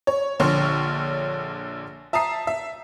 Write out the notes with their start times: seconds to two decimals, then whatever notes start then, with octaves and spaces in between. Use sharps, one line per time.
0.07 C#5
0.40 A#1 D3 C#5 C6 C#6 F6
2.13 E5 A5 A#5 D#6 C7
2.47 E5